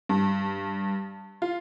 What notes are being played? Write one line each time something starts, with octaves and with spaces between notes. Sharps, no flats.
G2
F4